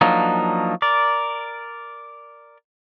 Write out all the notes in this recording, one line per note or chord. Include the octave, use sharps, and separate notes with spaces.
F3 F#3 A#3 D4 D#4
A#4 D5